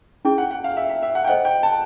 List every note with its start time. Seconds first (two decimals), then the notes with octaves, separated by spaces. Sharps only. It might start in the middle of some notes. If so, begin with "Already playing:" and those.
0.25 C#4 E4 G#4 G5
0.38 F#5
0.51 F#5
0.64 F5
0.77 E5
0.89 E5
1.03 E5
1.15 F#5
1.24 G5
1.27 A4 C5 D#5 F#5
1.45 G5
1.63 A5